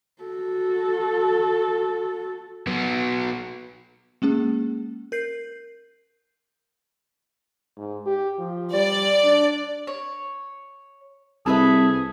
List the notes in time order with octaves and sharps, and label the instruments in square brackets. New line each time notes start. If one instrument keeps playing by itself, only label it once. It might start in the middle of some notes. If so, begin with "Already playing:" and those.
[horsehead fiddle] F#4 A4
[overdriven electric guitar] F#3 B3
[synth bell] G#3 A#3 C#4 G#4
A#4 G6 C7
[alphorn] G#2
G4
F3
[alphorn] G3 [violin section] D5
[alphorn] D4
[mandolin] C#5
[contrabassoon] C2 [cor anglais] G#4 [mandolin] A4 B4 E5